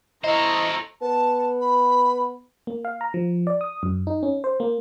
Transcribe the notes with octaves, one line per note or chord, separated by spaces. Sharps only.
E4 A4 C5 D#5 A#5 C#6
B3 A5
B5
A#3
F5
A#5
F3
D5
D#6
F#2
D#4
C#4
C5
A#3